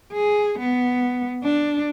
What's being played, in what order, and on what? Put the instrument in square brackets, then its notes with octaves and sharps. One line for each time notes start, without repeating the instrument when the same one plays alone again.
[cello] G#4
B3
D4